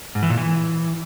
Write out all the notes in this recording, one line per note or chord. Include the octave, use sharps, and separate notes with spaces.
G#2
E3
A#2
E3